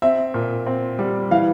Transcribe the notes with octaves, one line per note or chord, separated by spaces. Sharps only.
C4 E5
A#2
C4
G3
E3 F5